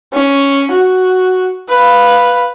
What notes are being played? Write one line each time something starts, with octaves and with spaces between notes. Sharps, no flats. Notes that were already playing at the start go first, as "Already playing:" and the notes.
C#4
F#4
B4 F5